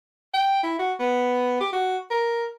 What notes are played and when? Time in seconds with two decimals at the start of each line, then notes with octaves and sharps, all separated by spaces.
0.34 G5
0.63 E4
0.79 F#4
1.00 B3
1.60 G4
1.72 F#4
2.10 A#4